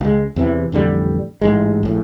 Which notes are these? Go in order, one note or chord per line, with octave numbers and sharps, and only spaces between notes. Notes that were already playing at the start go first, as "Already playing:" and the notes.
C#2 G#3
E2 C3 E3
A1 F2 D3 G3
A1 G#2 G#3
A#1 A2